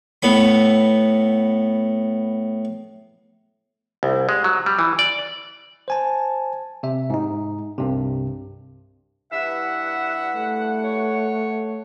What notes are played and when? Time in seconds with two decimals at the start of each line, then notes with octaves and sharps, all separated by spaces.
0.22 A2 B3 B5
4.03 C2
4.29 G#3
4.44 F#3
4.66 G3
4.79 E3
4.99 D5
5.88 C5 G#5 A5
6.83 C3 E5
7.10 G#2 D#4
7.78 C2 G2 C3
9.32 G2 E3 E5 F#5
10.36 A3
10.84 C#5